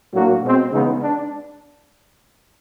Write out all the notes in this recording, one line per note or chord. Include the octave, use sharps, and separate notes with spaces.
A2 F#3 A#3 D4 F#4
B2 G#3 C4
C#3 E3 G#3 B3 D#4
D4